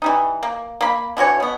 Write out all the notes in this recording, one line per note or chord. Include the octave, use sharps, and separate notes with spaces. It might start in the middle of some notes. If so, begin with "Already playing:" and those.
E3 G3 D#4
A#3
A#3 B5
D3 E3 F#4 C#5
B2 B3